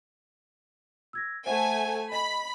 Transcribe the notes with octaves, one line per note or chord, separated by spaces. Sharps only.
E6 G#6 A#6
A3 C5 E5 F#5 G#5
D#5 B5